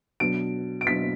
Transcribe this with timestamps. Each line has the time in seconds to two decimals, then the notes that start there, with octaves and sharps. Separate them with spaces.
0.20 B2 F#3 D4 D7
0.81 D7
0.87 B2 F#3 D4 B6